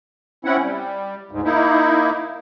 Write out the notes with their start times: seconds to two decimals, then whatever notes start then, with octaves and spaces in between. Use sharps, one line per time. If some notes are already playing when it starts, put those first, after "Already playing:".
0.45 C4 C#4 E4 F#5
0.62 G3
1.31 D2 G#2
1.44 A#3 D#4 E4